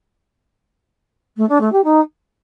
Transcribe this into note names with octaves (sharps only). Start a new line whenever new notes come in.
A3
D4
A3
G4
D#4